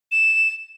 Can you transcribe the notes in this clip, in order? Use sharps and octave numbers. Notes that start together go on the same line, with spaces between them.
E7